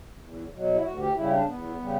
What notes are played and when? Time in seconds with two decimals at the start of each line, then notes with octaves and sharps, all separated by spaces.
0.19 E2
0.51 B2 F#3
0.74 E4
0.83 D2 F#4
0.99 G4
1.15 C#3 G3 E4
1.31 D4
1.46 E2 B3
1.80 C#3 G3